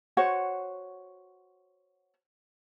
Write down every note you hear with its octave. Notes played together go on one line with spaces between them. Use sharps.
F#4 C5 C#5 F#5